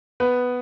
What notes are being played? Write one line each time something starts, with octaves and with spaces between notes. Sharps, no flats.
B3 B4